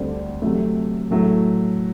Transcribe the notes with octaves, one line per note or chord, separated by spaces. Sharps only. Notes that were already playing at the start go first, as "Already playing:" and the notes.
Already playing: D2 D3 G3 C4
C3 F#3 A3
A2 F#3 A3